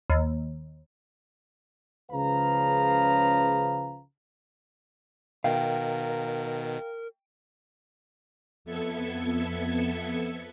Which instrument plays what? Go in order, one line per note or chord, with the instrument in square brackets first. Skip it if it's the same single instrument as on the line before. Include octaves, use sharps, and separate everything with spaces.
[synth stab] D#2
[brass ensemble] C#2 C#3 F3 B4 F5 A#5
[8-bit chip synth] B2 D#3 [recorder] A#4 [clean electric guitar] F5 [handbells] G5
[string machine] F2 B3 A4 E5 G#6 C#7